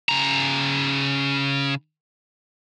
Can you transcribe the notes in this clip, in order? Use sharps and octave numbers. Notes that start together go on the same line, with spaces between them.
C#3 A#5